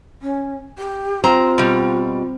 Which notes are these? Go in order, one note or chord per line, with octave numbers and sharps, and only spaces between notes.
C#4
G4
C4 F4 A#5
B2 G3